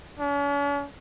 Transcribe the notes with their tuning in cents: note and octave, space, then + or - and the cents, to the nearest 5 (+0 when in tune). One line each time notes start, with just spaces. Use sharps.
C#4 +45